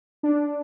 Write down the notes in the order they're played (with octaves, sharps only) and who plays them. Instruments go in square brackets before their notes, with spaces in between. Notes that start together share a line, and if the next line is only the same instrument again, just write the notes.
[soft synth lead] D4